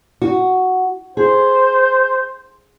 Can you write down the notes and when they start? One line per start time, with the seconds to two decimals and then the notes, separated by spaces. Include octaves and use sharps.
0.22 F#4
1.17 G#4 C5